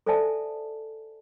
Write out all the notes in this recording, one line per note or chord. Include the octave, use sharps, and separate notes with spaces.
A4 C5 D5 E5 G#5 A5